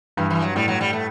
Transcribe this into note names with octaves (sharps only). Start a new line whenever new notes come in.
G2 E3
E3
F#3
A2 G3
F#3
G3
A3